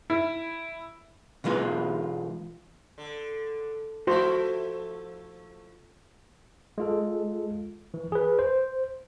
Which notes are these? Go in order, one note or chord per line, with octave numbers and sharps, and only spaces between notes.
E4
B2 E3 G#3 F4 B4
D3
F3 A3 E4 F#4 C5
G#3 F4 A4
E3
G#4 B4
C5